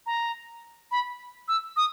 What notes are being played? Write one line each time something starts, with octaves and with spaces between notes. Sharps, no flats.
A#5
B5
E6
D#6